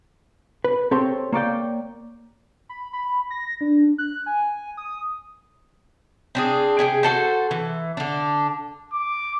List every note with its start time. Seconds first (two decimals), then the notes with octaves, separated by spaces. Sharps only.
0.64 B4
0.91 C4 G4 A4 C5 C#5
1.33 A#3 C#5 D5 G5
2.69 B5
2.93 B5
3.31 A#6
3.61 D4
3.98 F#6
4.26 G#5
4.77 D#6
6.35 C4 D4 G#4
6.79 C3 G#4 G5
7.03 F#4 A4 C5
7.51 E3
7.97 D3 D4
8.93 D6